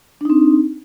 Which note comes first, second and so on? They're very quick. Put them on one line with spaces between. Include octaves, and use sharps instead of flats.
D4 D#4 C4